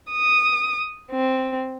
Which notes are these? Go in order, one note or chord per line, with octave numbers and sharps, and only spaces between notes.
D#6
C4